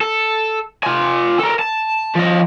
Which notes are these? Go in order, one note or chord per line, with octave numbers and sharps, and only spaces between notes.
A4
F4 G#5
A4 A#4
A5
F3 D#5